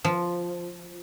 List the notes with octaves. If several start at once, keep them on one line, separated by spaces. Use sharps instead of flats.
F3